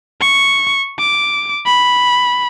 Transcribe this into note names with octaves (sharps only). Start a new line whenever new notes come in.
C#6
D6
B5